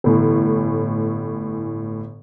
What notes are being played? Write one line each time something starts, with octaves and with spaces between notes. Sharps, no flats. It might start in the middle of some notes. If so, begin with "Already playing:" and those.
G1 A2 E3